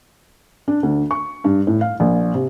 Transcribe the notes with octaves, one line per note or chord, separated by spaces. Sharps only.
D4
D2
C#6
G2
A2
F5
A#1
C3